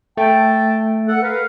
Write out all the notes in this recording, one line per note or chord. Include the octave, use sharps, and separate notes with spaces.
A3 G5 A5
A4 F#5
A#4 B4 F5